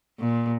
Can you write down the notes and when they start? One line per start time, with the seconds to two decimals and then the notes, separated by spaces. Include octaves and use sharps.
0.20 A#2